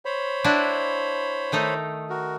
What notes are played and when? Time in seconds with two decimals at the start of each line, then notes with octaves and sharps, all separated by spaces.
0.05 C5 C#5 B5
0.44 D4 E4 F#4
1.52 D#3 A3 D#4
2.10 F#4 A#4